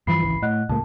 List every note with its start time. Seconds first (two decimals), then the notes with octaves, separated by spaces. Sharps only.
0.07 G2 E3 F3 F5 B5 C7
0.22 G#1 C#2 E3
0.42 A2 D#5 F#5 F#6
0.69 C#2 A2 A#3 A5